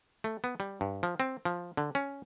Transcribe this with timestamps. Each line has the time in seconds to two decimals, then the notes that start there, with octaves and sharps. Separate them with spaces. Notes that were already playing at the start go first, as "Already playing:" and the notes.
0.24 A3
0.44 B3
0.60 G3
0.81 G2
1.03 F3
1.20 C4
1.45 F3
1.77 D3
1.95 C#4